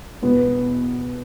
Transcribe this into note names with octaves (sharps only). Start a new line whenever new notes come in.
E2 B2 B3